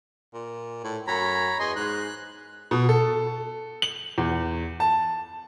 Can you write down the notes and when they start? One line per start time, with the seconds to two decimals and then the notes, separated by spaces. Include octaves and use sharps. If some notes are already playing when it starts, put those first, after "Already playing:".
0.34 A#2
0.84 A2
1.07 F#2 C#5 A#5 B5
1.59 E2 D#5 G#5 C6
1.76 G#2 F#6
2.71 B2
2.89 A4
3.82 F#7
4.18 E2
4.80 A5